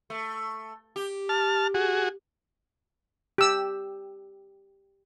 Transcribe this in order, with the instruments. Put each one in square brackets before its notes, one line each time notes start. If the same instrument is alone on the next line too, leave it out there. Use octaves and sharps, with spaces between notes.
[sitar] A3
G4
[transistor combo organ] A5 F6
F#4 G#4
[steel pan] G4 E6